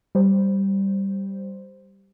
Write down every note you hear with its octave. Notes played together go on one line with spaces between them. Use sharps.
G3 C5